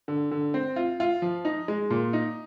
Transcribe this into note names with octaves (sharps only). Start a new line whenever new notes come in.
D3
D3
C4
F4
F4
F3
D#4
G#3
A#2
D#4